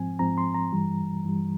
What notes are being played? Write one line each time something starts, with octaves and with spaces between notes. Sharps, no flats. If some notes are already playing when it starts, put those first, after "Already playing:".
Already playing: G#2 F3 C4 G#5
G#2 F3 C4 A#5
C6
A#5
G2 E3 G3
G2 E3 G3